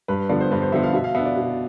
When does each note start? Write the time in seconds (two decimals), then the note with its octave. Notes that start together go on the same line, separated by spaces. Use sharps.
0.08 G2 B4
0.29 D3 F3 B3 D5
0.41 C5
0.51 G2 B4
0.62 C5
0.72 D3 F3 B3 E5
0.83 F5
0.94 B2 E5
1.04 F5
1.15 B3 D4 E5
1.26 D5
1.36 B2